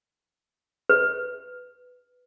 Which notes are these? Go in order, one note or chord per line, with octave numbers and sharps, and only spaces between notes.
B4